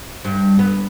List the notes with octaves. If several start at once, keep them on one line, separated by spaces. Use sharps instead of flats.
G2
B3